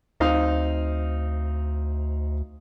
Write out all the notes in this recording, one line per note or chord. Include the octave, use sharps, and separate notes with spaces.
D2 C4 D#4 F5